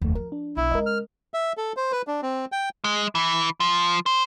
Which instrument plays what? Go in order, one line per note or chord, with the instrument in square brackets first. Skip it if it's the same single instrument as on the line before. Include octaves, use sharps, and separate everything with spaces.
[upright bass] F1 [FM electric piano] D#2 A3
[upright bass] F3 [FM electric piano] A#4
[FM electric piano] D4
[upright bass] B1 [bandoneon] E4
[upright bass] C#3 G#3 [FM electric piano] A#4 D#5
[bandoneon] F6
[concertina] E5
A4
C5
B4
D4
C4
G5
[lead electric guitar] G#3
E3
F3
C5